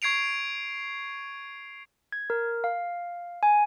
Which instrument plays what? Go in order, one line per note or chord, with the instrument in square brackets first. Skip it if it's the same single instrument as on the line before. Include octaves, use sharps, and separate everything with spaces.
[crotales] C#6 G#6 C7 D7 F7
[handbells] G#6
A#4
F5
G#5